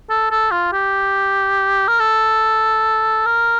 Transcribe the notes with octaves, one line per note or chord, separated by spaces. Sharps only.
A4
A4
F4
G4
A#4
A4
A#4